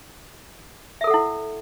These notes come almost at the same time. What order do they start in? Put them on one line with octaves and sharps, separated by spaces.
E5 A#4 A4 F#5 E4